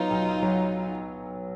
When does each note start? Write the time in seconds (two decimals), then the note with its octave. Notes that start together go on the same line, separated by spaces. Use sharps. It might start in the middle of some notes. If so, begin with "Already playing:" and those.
Already playing: F#3 B3 D#4 F4
0.10 B1
0.43 F#3